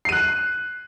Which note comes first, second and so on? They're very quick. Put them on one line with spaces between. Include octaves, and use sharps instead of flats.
C7 D#7 F#6